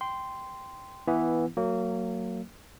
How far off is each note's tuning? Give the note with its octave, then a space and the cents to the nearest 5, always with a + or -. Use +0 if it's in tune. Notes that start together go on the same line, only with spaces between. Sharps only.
G5 +0 C6 -10
E3 +0 B3 -5 E4 +0
F#3 +0 A#3 -25